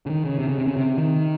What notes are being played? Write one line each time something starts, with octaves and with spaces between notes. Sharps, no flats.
C#3
D#3
C#3
C3
C#3
C3
C#3
C3
D#3